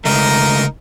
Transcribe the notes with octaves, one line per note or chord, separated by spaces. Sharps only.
C#3 G#3 A3 D#4 A#4